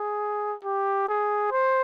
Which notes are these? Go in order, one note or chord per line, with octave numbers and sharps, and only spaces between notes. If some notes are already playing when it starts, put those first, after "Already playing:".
Already playing: G#4
G4
G#4
C5